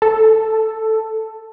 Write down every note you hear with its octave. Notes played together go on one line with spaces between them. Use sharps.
A4